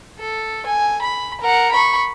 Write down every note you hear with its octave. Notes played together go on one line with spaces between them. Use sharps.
A4
G#5
B5
A#4 F#5
B5 C#6